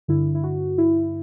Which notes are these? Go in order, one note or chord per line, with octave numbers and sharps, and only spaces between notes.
G2 D3 E4
E4
F#4
E4